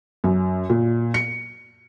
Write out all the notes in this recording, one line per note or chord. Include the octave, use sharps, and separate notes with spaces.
F#2
A#2
C#7